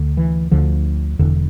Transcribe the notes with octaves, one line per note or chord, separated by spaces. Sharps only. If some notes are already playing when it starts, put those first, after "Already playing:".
Already playing: D2 D3
E3
D2 D3 F3
E1 E2 D3